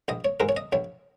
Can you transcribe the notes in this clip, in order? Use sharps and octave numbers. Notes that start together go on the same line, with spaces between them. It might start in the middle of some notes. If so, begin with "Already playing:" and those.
A#1 D#5
C#5
G#2 G#3 A#4
C#5
D#5
A#1 C#5